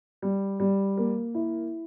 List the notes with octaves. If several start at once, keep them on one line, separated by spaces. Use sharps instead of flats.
G3
G3
A#3
E4